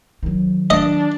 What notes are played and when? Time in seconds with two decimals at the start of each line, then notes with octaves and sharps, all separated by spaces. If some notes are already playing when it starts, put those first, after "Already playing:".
0.23 D#3 F#3
0.70 D4 D#5